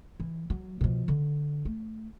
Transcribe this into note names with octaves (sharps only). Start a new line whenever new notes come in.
E3
F#3
B2 F3
D3
A3